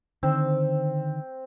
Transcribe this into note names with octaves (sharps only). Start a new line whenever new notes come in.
D3 D#3 C4